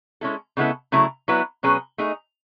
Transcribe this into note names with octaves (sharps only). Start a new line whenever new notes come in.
G#3 C#4 E4 A4
C#3 G#3 B3 E4 A4
C#3 F#3 A3 E4
F#3 B3 E4 B4
B2 F#3 C#4 G#4 B4
A3 D#4 G#4